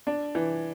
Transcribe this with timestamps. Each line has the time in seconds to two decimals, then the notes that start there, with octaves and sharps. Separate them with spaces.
0.07 D4
0.35 E3